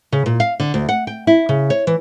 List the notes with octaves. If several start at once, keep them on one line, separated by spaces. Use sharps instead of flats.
C#3
A#2
F5
D3
D2
F#5
G5
E4
C#3
C#5
E3